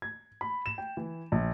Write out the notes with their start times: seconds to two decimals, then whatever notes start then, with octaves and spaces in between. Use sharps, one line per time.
0.02 G#6
0.41 B5
0.66 E7
0.78 G5
0.97 E3
1.32 A#1